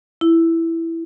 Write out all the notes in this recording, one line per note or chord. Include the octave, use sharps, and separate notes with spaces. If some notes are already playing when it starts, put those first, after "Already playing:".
E4